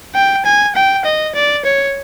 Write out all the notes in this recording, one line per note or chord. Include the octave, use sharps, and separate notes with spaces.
G5
G#5
G5
D#5
D5
C#5